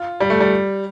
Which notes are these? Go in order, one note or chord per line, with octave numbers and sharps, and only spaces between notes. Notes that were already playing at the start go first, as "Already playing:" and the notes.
Already playing: F4
G3
A3
G3